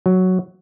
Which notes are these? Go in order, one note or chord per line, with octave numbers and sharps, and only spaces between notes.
F#3